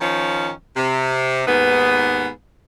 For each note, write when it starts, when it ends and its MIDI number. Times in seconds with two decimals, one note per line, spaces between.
0.01 0.49 51
0.01 0.49 53
0.01 0.49 61
0.76 1.42 48
1.47 2.28 39
1.47 2.28 44
1.47 2.28 59